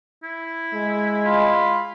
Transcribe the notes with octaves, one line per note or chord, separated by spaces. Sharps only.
E4
G#3
F4 B5